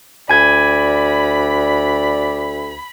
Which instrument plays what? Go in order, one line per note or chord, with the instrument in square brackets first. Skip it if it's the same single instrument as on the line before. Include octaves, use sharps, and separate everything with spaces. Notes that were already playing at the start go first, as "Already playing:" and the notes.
[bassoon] D2 [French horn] D5 [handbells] G#5 G#6 [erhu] B5